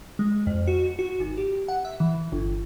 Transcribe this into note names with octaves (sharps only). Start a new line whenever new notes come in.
G#3
F2
F#4
F#4
G#1
G4
F#5
E5
E3
G1